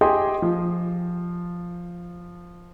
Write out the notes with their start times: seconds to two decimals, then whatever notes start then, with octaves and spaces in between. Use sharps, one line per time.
0.01 G4 G#4 D#5 G5 C6
0.42 F3